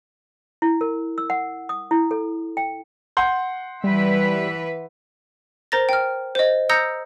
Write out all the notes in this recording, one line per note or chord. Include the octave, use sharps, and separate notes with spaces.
E4
A#4
E6
F#5
D#6
E4
A4
G5
F#5 C6 G6
E3 G3 B4 E5
A#4 C5 A#5 A6 A#6
G5 F6
C5 D#5
A#5 D#6 E6 G6 A#6 C#7